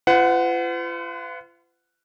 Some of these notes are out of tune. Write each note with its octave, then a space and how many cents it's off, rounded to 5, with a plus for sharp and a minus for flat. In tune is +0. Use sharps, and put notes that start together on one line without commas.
F4 -35 B4 +45 F#5 +0